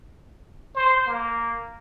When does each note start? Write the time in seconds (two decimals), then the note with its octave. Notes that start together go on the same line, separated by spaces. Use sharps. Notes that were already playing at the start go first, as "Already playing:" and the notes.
0.75 C5
1.06 A#3